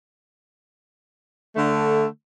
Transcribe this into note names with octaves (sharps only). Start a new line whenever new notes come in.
D3 A3